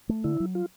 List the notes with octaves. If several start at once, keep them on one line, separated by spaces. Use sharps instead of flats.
A3
D3 E4
F#3
F4